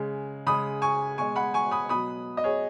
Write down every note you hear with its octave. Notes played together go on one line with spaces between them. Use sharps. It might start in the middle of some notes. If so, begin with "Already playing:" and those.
Already playing: C#3 G#3
C#3 G#3 B5 D#6
G#5 C#6
B2 G#3 G#5 C#6
F#5 B5
G#5 C#6
B5 D#6
B2 F#3 B5 D#6
D#5
G#4 C#5